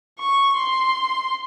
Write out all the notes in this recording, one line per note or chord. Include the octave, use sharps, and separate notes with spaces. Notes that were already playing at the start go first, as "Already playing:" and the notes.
C#6
C6